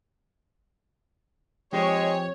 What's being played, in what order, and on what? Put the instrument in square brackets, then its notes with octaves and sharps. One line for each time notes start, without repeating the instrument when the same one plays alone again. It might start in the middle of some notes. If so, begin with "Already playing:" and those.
[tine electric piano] F3 C4 [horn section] G#3 [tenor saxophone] G4 [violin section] C#5